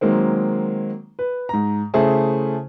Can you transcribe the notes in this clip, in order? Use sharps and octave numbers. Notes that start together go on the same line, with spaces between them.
D#3 F#3 G#3 A#3 C4
B4
G#2 A#5
C#3 A3 E4 G#4 C5 A5